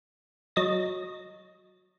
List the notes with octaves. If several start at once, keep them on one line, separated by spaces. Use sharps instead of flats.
F#3 D#5 A6 A#6